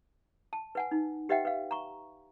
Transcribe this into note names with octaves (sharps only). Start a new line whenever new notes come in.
A5
B4 F#5 G#5
D#4
G4 B4 D#5 E5 F#5 G5
B4 F5
A#5 C#6